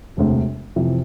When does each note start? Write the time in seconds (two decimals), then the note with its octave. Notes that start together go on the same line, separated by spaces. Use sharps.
0.17 E1 D2 C3
0.76 F2 C3 E3